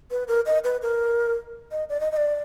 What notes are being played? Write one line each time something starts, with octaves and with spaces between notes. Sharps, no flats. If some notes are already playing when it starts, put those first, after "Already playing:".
B4
A#4
D#5
B4
A#4
D#5
D5
D#5
D#5
D5